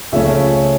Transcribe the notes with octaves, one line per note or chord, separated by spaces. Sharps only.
C#2 C#3 F3 A3 C#4 C#5 E5